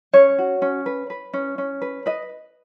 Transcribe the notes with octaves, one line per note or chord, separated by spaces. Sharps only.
C#4 C#5
F#4
C#4
B4
B4
C#4
C#4
B4
B4 D#5